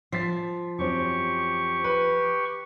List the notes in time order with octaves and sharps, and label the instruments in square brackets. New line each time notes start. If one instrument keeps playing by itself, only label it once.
[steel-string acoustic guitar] F3 [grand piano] A6 B6 C7
[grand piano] F#2 C4 [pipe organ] G4 C#6
[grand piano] B4